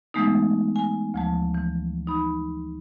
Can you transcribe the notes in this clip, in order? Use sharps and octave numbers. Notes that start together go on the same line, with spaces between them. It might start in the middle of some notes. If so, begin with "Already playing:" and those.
E3 G#3 A3 B3 D#4
G#5
D2 F3 A5
E3
D#4 B5